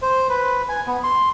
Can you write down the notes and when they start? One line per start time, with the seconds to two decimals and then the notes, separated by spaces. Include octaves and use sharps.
0.02 C5
0.29 B4
0.69 G#5
0.87 B3
1.04 C6